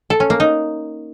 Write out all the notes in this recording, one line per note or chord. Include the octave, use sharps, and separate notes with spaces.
A4
C#4
A#3
D#4